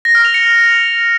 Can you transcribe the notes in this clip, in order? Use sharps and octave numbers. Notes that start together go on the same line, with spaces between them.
A#6
F6
F7
C#7